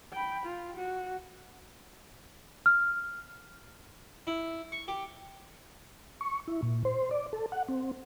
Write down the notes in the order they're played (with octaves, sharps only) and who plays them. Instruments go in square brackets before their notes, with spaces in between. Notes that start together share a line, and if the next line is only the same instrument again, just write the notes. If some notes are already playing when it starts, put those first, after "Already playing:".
[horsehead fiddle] G5 B5
F4
F#4
[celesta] F6
[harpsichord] E4
C#6
G4
[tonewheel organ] C#6
E4
A#2
C5
D5
A4
F#5
C4